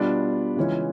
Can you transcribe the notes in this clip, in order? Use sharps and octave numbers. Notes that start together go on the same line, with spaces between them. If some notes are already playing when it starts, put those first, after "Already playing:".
Already playing: B2 G3 B3 D4 F4
C#3 E3 G#3 C#4 F4